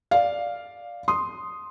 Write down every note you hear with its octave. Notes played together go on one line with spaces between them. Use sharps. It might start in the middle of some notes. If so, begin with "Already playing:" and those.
D5 F5
C6 D#6